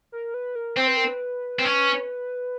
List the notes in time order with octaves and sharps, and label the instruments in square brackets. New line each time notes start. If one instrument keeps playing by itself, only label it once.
[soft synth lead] A#4
B4
A#4
[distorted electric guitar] C4 [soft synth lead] C5
[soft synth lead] B4
A#4
B4
[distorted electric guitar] C4
C#4